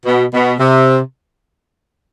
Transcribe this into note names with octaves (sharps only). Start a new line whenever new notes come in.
B2
B2
C3